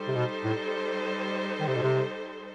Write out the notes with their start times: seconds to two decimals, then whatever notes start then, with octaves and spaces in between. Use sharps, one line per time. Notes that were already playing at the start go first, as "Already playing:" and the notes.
Already playing: G3 D#4 A4 C5
0.08 C3
0.15 B2
0.44 A2
1.60 D#3
1.68 C3
1.75 B2
1.83 C3